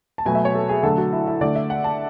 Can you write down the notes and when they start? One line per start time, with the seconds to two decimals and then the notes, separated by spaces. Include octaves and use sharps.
0.18 A5
0.26 B2 F#3 A3 G#5
0.35 E5
0.45 C#5
0.55 A4
0.69 G#4
0.83 D3 F#3 A3 A4
0.98 F#4
1.12 E4
1.27 E4
1.41 D3 A3 D5
1.55 E5
1.70 F#5
1.84 A5